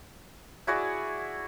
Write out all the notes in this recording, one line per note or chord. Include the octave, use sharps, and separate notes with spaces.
E4 F#4 G#4 D5